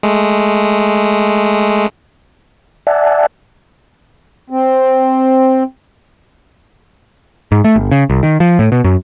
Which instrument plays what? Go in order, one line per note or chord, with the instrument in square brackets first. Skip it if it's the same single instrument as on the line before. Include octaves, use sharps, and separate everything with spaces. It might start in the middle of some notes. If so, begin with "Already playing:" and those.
[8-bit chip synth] G#3 A3
[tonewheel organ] D5 E5 F#5 G#5 A5
[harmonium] C4
[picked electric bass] G#2
A3
G1
C#3
C2
D#3
F3
A2
B2
F#2